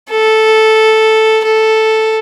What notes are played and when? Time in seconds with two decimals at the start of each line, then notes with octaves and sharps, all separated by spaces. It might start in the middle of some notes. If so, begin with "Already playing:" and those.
0.10 A4
1.45 A4